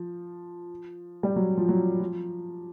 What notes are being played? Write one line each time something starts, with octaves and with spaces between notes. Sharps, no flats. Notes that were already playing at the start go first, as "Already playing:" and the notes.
Already playing: F3
G3
F#3
F3
F#3
F3